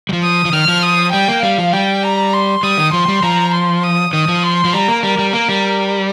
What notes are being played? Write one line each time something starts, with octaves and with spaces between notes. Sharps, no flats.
G3
F3
D#6
F3
D#3 F6
F3
D#6
G3 G5
A#3
G3 F5
F3
G3 G5
A#5
C6
G3 D#6
D#3
F3 C6
G3
F3 A#5
C6
D#6
D#3 D#6
F3
C6
F3
G3 A#5
A#3
G3 A#4
G3
A#3 A#4
G3